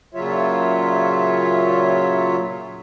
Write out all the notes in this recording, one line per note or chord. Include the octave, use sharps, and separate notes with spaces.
A#2 C#3 F#3 F4 C#5 E5